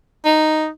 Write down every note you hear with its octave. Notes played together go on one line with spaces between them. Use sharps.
D#4